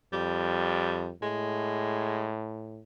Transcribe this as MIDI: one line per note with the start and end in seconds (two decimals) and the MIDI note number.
0.13 1.12 41
0.13 1.12 55
1.22 2.82 45
1.22 2.30 56